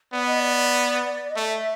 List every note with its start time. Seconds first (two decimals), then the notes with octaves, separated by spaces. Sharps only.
0.13 B3 D5
0.26 D#5
0.40 D5
1.30 D#5
1.36 A3 E5